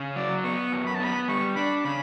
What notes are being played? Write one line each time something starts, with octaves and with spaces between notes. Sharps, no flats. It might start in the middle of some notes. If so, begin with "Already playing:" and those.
Already playing: C#3
F#3 D5
B3 C#6
F#2
B5
A5
B3 B5
G3 C#6
D4 B5
C#3 B5